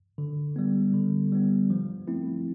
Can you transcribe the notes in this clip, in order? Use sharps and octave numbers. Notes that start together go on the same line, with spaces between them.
D3
G3 B3
D3
G3 B3
F3
A3 C4 E4